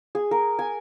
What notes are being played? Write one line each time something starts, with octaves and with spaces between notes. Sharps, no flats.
G#4
A#4
G#5